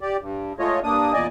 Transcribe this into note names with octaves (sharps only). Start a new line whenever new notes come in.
G4 D5
G2
G#3 A3 F4 C#5 D#5
G2 A#3 D4 D#6
E2 A#2 D5 D#5 G#5